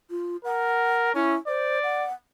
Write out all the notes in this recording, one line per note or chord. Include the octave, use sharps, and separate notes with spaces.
F4
A#4 F#5
C#4 E4
C5 D5
F#5